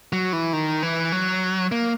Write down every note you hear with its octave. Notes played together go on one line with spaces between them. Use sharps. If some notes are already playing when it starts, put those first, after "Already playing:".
F#3
E3
D#3
E3
F#3
A#3